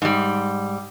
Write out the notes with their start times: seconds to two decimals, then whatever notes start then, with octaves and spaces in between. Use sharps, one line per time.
0.02 G#2 G3